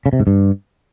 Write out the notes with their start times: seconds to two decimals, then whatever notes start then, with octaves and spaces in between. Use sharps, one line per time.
0.06 C#3
0.13 C3
0.20 G#2
0.27 G2